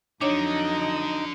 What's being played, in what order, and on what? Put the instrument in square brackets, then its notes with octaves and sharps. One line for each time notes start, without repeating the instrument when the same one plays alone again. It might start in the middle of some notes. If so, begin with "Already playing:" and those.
[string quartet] F2 F#3 D#5 [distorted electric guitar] D3 [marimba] D4 C#5 [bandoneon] D#4